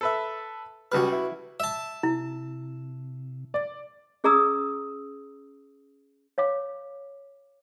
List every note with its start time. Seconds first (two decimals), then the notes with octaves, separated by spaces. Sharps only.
0.01 A4 B4 E5
0.92 C#2 G3 F#4 B4 F6
1.12 E4
1.60 E5 A5
2.03 C3 E4
3.54 D5
4.24 C#4 G#4 D5 A#5 D#6 E6
6.38 C#5 F5 D6